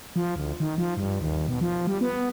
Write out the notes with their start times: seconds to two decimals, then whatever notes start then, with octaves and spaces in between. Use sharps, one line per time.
0.16 F3
0.36 D2
0.60 D#3
0.78 F3
0.97 G2
1.21 D#2
1.48 B2
1.61 F3
1.87 G3
2.01 B3